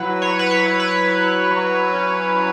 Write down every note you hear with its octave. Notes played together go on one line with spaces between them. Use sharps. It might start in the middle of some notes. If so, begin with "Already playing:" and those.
Already playing: F#3 E4 B4
F#3 C#5
B4
C#5
E4
B4
E4
F#3
C#4
F#3